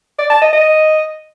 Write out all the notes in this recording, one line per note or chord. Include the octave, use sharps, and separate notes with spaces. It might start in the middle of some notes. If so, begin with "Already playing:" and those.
D5
A5
D#5
D#5